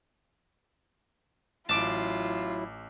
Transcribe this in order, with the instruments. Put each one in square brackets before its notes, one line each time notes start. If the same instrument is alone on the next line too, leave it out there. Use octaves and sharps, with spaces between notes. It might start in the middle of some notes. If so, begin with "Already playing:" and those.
[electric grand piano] A1 D6 D7 [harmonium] F#3 E4 [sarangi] F4 [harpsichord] A5